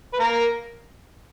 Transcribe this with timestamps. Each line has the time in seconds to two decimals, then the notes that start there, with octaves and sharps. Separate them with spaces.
0.13 B4
0.19 A#3 A#4